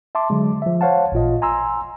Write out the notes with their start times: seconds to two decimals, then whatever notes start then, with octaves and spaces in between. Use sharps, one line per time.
0.15 E5 A5 C6 D6
0.30 D3 F#3 G#3
0.62 F3 E5
0.81 C5 C#5 F5 F#5 A5
1.12 A1 A#2 F4 D#5
1.42 G#5 A#5 C6 E6